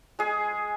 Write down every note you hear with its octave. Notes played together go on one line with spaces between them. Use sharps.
G#3 G#4